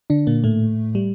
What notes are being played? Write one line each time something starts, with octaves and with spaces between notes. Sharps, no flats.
D3 D4
A#2 A#3
A2 A3
G3